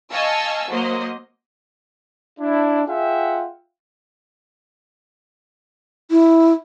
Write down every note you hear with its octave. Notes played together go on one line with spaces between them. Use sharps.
D#5 F5 G#5 A5 C#6 E6
F#3 A#3 C5 D#5
D4 E4
F4 G#4 E5 F#5 G5
E4